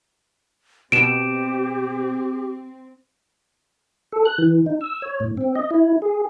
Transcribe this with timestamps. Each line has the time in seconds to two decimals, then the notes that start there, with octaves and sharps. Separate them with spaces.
0.92 B2 C4 G4 D7 E7
4.12 A4
4.25 F#6
4.38 E3
4.66 D#4
4.81 E6
5.02 C#5
5.20 A2
5.37 C4
5.55 D#5
5.71 E4
6.02 G#4